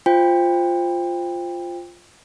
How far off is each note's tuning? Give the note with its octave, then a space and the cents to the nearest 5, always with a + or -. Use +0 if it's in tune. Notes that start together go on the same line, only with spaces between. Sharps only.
F4 +0 C5 +0 G5 +25